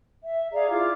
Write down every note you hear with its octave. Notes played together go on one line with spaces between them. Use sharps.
E5
G#4 D5 F5 A#5
E4 F4 D6